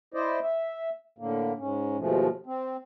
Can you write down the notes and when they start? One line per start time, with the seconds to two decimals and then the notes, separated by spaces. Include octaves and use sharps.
0.14 E4 C5 D5 D#5
0.43 E5
1.18 A2 D3 A#3
1.59 G#2 C#4
1.98 D#2 B2 F3 G#3 A3
2.46 C4